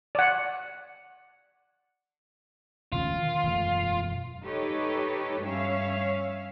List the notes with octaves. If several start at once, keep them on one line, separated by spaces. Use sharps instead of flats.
D5 F#5
E1 D2 C#4 F4
D#3
E1 F#2 A3
D#4 G4 A4 B4 C#5
G2 C#4 C#5 E5 F5